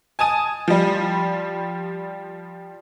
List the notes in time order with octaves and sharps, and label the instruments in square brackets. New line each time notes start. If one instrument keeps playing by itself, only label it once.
[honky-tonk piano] G#5 A5 D#6 D#7
F3 G3